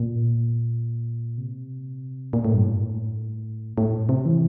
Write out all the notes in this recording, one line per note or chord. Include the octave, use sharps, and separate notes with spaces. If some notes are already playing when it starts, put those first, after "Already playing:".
Already playing: A#2
C3
A#2
A2
G2
A2
A2
C3
E3